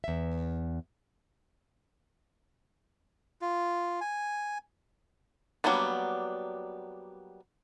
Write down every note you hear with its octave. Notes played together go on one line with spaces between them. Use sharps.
E2 E5
F4
G#5
F#3 G3 A#3 B3 D4